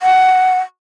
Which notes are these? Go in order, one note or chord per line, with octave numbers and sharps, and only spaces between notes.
F#5